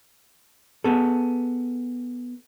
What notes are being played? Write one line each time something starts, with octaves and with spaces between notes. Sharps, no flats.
B3 G#4 A4